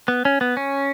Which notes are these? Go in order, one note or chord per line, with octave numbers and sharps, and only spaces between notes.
B3
C#4
B3
C#4